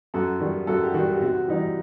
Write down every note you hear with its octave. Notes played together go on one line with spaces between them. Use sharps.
F#2 F#4 A4
D#3 G3
F#2 F#4 A4
G4
D#3 G3 F#4
G4
C3 F#4
E3 G3 D#4